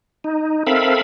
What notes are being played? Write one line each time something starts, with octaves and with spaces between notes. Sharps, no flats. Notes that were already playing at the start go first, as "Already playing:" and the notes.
D#4
C4 A4 A#4 E5 F5 B5